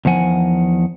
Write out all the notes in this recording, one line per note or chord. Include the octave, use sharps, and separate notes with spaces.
E2 D#3 F3 F#5 G#5